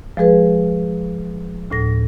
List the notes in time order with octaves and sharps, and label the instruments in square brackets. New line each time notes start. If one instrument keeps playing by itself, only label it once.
[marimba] F3 G#3 G#4 B4
D2 A2 A#6